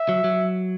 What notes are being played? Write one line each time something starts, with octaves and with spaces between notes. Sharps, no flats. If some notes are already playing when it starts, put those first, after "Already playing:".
Already playing: E5
F#3
F#3